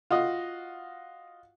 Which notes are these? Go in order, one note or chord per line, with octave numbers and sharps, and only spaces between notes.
F4 F#4 D#5